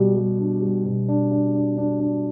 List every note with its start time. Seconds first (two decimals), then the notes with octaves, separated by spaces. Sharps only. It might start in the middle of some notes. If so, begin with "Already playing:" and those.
Already playing: B2 G3 G4
0.16 G3
0.39 D4
0.62 G3
0.85 B2
1.08 D4
1.32 D4
1.55 D4
1.77 D4
2.00 D4